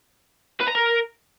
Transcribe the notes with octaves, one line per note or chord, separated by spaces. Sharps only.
B4
A#5
A#4